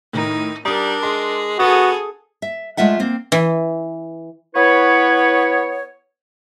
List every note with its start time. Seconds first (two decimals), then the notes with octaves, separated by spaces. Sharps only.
0.13 A2 D#3 D#4 A#4
0.65 G3 D4 A#4 A#5 D#6
1.03 G#3 C6
1.59 B3 F#4 G#4 A4 D#6
2.42 E5
2.77 G#3 A3 F4 E5 F#5
3.00 A#3 C4
3.32 E3
4.55 B3 E4 B4 C#5